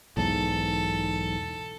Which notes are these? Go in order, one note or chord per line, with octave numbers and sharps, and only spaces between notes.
B1 E2 G#2 A4